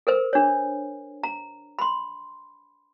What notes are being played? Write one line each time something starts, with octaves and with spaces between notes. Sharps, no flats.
A4 A#4 C5
D4 C#5
A#5
B5 C6